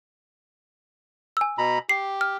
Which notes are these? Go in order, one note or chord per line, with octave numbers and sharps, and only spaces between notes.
G#5 E6
B2 A#5 B5
G4 C7
F6